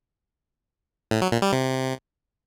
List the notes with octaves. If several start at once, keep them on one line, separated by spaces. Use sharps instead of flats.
A2
F#3
A#2
G3
C3